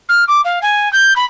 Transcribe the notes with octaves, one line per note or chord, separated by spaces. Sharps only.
F6
D6
F5
G#5
G6
B5